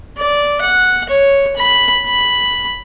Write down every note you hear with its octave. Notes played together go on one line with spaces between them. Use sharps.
D5
F#5
C#5
B5
B5